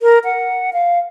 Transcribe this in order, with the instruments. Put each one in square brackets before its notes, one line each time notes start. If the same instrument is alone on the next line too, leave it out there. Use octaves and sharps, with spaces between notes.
[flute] A#4
F#5
F5